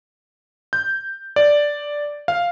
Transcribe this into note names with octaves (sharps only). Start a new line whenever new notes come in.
G6
D5
F5